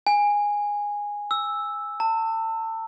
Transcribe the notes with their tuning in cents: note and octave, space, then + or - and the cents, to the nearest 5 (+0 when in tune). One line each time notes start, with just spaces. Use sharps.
G#5 -10
E6 -5
A5 +35